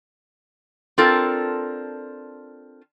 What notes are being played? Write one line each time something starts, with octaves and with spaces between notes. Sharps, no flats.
C4 D4 F4 A4 A#4